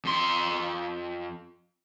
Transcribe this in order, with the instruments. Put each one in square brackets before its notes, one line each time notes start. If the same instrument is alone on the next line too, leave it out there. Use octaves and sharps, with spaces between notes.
[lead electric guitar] F2 C6